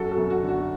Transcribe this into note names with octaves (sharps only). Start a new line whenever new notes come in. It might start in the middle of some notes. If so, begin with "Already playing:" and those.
Already playing: F#2 F#4 A4
F#4 A4
F#2
F#4
D3
F#4